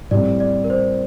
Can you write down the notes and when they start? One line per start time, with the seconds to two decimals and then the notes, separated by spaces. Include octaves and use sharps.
0.11 A2 G3 C4 D5
0.40 D5
0.64 A#4
0.70 C5